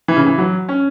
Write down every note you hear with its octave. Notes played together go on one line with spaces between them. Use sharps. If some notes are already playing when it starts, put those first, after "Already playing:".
E3
C#3
E3
F#3
C#4